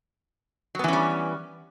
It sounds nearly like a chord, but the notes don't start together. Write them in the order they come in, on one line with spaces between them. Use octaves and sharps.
F#3 B3 E3 C#4 G3